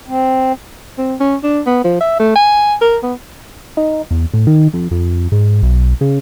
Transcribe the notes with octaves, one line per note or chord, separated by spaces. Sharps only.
C4
C4
C#4
D4
B3
F3
E5
A3
G#5
A#4
B3
D#4
E2
A2
D#3
F2
F2
G#2
B1
C#3